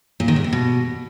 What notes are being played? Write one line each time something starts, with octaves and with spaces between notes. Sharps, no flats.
A#2
D#3
G#2
C3
B2